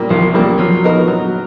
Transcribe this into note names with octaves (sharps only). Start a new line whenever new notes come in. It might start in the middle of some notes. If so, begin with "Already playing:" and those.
Already playing: A#2 G3 A#3
C2 F3
A#2 G3 A#3
F3 F#3
B3 D#4 F#4 A#4
F#3